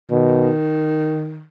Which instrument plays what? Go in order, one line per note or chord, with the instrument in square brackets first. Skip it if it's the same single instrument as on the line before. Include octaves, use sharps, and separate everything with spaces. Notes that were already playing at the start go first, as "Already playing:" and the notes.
[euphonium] B2 [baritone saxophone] D#3